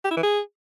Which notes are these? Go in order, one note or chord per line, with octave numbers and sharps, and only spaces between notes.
G4
E4
E3
G#4